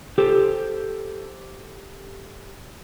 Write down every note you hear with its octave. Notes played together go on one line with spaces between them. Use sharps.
G4 A4 C5